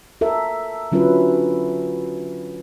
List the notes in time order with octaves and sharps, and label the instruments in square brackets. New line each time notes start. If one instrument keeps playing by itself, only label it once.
[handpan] A4 A#4 E5
D3 F#3 C#4 E4 F4 B4